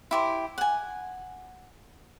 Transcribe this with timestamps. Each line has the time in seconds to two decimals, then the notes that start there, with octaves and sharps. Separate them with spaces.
0.11 E4 G4 C5
0.58 F#5 G#5